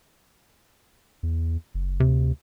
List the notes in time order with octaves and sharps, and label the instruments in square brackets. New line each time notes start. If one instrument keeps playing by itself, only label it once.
[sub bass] E2
F#1
[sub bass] D2 [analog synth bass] C3